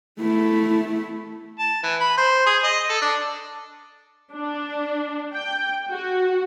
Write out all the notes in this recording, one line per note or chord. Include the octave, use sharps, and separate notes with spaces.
A3 E4
A5
E3
B5
C5
G#4
D#5
A4
D4
D4
G5
F#4